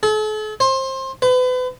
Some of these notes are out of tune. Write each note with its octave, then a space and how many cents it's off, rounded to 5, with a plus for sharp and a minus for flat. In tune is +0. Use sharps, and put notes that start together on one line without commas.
A4 -45
C5 +25
B4 +35